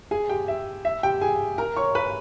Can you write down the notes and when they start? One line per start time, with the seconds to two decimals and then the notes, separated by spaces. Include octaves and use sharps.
0.11 G#4 G#5
0.29 G4 G5
0.48 E5
0.85 E5
1.03 G4 G5
1.21 G#4 G#5
1.58 A#4 A#5
1.77 C#5 C#6
1.95 B4 B5